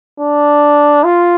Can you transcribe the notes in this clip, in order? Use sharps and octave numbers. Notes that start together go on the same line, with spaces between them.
D4
F4